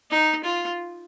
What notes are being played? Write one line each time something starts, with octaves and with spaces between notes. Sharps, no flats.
D#4
F4